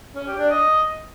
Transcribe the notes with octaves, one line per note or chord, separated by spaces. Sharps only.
C#4
G4
D4
D#5